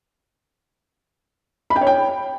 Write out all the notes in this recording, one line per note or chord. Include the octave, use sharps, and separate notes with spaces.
B5
G5
C#5
G5